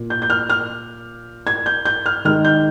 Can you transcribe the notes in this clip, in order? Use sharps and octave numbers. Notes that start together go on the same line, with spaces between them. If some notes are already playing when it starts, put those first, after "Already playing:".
Already playing: A#2
G6
G6
F6
F6
G#6
G6
G6
F6
D#3 G#3 D#4 F6
G6